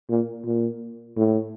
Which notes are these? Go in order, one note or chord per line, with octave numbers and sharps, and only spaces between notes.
A#2
A#2
A2